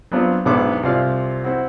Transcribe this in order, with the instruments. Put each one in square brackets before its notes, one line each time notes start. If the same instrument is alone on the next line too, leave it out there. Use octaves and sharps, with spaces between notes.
[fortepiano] F#3 B3 C4 D4 F4
B1 G#2 B3 D4 E4 D6
C2 C4 F4 D5 F5
C4 E4 F#4